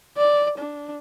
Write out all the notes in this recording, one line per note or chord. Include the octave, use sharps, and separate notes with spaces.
D5
D4